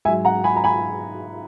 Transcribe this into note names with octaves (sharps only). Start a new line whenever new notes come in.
G#2 F#3 E5 G#5
F#5 A#5
G#5 B5
A#5
G#5 B5